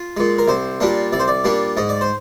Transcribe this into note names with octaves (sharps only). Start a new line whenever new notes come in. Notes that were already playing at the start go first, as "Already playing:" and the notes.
Already playing: F4
A#2 G#3
A#4
C2 C5
A#2 G3 A#3 D4
C2 D5
C5
D5
A#2 G3 A#3 D4
G#2 D#5
D5
C5